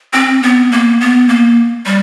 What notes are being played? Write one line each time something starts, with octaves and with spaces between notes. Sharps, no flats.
C4
B3
A#3
B3
A#3
G3